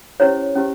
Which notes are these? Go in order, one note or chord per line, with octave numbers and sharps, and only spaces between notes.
C#4 E4 G4 C5 C#5
C#4 E4 G4 C5